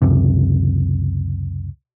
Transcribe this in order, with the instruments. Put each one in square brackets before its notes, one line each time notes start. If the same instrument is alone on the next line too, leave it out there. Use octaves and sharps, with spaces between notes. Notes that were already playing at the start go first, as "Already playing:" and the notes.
[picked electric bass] C#2 F#2 C3